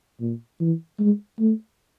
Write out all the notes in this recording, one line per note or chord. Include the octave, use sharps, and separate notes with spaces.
A#2
E3
G#3
A3